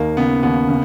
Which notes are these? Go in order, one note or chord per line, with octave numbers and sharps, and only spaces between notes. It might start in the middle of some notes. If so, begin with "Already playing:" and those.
Already playing: D#2 A#3 D#4
C#3 B3
D#2 B3
C#3